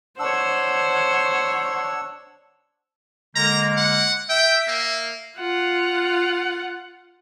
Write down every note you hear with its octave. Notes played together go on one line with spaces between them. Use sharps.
D4 C5 C#5 F#5 E6
D3 G#3 A#3 A#5
F#5
E5 G5
A#3
F4 F#5